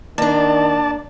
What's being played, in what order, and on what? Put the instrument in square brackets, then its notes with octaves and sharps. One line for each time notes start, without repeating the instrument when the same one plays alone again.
[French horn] D#3 [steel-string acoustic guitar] A#3 D4 [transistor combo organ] D5 A5